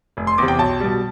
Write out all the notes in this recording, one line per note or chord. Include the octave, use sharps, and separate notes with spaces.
F1
C6
E2 C3 D6
G5
B1 A5
B2 G3